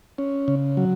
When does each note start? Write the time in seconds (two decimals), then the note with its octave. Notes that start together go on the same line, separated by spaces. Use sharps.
0.18 C#4
0.48 C#3
0.77 F#3